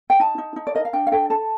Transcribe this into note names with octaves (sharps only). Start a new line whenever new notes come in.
G5
D#4 A5
D#4
D#4
D5
A#4 D#5
F5
D4 G5
F5
A4 G5
A4 A5